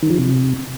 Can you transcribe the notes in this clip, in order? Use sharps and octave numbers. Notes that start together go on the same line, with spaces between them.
D#3
F3
C3